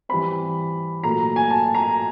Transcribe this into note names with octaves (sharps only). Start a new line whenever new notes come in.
E3 G3 C4 B5
A#2 F#3 A3 A#5
G#5
A5
A#5